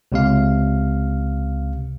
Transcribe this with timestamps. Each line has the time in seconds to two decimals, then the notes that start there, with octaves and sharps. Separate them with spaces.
0.12 C#2 C3 F5